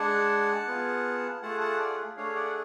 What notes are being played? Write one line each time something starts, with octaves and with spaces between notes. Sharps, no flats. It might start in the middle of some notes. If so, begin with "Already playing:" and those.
Already playing: G#3 D4 G#4 F#5 A5
B3 F4 G#4
A3 F4 G#4 F#5 A5
F#5 A5
D5 F#5
A3 D4 G#4 C#5 F5
D5 F#5